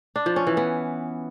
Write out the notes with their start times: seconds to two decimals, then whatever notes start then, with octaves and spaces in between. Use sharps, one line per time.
0.16 D4
0.26 F3
0.36 C#4
0.47 E3
0.57 B3